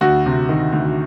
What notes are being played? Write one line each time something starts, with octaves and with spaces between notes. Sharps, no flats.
D2 F#4
C3
D#3
D2